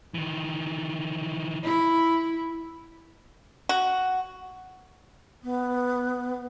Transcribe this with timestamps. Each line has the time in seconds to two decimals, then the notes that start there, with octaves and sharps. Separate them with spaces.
0.14 D#3 E3
1.64 E4
3.69 F#4
5.43 B3